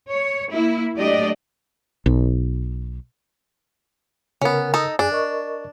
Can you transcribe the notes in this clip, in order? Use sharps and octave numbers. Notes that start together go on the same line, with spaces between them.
C#5
A#3 E4
F#3 A3 D4 G4 D5 D#5
B1
C#3 B3 C#4 A#4
D#4 A4 D#5
F#2 D4 G#4 G#5
A#4 D#5 C#6